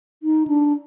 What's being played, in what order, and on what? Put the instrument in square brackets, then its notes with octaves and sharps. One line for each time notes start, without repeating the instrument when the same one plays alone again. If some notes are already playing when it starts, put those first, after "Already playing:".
[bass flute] D#4
D4